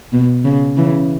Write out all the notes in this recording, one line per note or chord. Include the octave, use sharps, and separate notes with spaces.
B2
C#3
C#3 E3